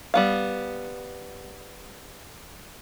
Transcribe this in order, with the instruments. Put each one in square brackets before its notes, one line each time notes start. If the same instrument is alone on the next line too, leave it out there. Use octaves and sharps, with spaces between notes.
[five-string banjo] G3 B3 F5